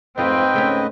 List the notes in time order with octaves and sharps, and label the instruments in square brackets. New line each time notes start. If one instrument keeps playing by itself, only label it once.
[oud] F2 A3 F4 [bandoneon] G#2 B4 D#5 [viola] C4 [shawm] G5
[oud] C#3 A3 C#4